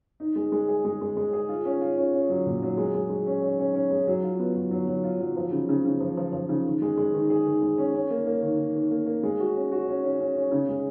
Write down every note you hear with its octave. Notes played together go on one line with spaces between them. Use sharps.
D#4
G#3
G#3
G#4
G#3
G#3
G#3
G#4
F4
C#4
F4
C#4
C#4
F#3
A#2
F#3
G#3
G#3
G#3
C#4
C#4
C#4
C#4
G#3
F#3
F4
B3
F#3
F#3
F#3
F4
F#3
F3
C#3
C#3
C#3
F3
F3
F3
C#3
D#3
G#3
G#3
D#3
G#4
D#3
G#3
C#4
C#4
A#3
A#3
D#3
D#3
D#3
A#3
A#3
G#3
F#4
C#4
F#4
C#4
C#4
C#4
C#4
C#3
G#3